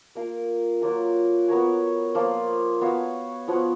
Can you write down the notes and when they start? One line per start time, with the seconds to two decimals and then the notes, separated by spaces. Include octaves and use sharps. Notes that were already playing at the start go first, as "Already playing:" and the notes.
0.15 A#3 F4 A#4 F5
0.81 F#3 A#3 F4 A#4
1.48 B3 F#4 A#4 C#5
2.15 F3 A#3 F4
2.81 B3 F#4 C#5 F5
3.48 F3 B3 F#4 C#5